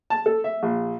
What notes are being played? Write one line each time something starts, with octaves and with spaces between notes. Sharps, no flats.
A5
A4
E5
A#1